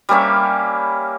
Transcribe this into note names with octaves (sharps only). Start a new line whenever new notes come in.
G3 A#3 C#4 E5